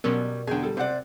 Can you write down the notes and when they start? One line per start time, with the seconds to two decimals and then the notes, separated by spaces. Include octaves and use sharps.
0.04 B2 F#3 G3 B3 C#4 F#4 A#4
0.47 E2 D3 G#4 G5
0.63 G3 A4
0.77 C3 C4 D5 F#5